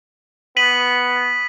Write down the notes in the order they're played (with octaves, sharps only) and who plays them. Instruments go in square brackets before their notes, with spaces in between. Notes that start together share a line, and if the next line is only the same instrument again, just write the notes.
[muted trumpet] B3 [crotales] B6 D#7 F#7